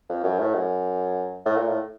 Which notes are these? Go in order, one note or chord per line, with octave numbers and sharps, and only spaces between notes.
F2
F#2
A2
F#2
A2
A#2
A2